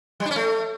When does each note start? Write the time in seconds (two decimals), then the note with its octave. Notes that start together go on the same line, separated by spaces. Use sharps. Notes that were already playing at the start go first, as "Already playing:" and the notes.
0.20 G3
0.25 D4
0.31 C#4
0.36 A3